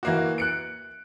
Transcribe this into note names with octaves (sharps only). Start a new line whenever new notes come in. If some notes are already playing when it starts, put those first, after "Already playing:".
E3 A#3 F#4
F#6 C#7 D7